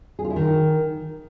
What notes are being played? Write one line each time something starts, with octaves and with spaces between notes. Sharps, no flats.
G#4
F4
E4
D#3